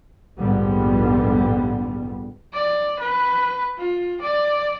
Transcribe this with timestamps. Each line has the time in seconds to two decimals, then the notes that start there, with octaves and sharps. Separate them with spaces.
0.38 A#1 F2 G#2 D3 G3 B3
2.53 D5
2.99 B4
3.78 F4
4.21 D5